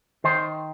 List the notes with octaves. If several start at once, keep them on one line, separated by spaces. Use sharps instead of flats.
D#3 C5